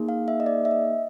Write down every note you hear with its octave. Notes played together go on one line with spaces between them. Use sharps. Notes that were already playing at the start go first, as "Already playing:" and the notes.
Already playing: A#3 D#4 G#4
F5
E5
D#5
D5
E5
D#5